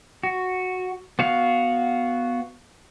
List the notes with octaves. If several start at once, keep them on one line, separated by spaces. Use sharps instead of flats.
F#4
B3 F#4 F5 F#5